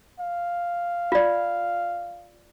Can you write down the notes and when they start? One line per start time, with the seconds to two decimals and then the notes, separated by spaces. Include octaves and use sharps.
0.20 F5
1.12 F4 D5